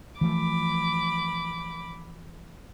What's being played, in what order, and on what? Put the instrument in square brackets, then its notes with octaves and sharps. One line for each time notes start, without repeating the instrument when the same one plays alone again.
[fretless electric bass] E3 F3 A3 [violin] B5 D6